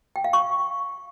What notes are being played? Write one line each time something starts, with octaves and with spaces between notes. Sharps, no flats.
G5
F5
C#6